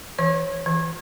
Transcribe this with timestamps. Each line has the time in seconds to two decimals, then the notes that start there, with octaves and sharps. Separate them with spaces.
0.19 E3 C#5
0.66 E3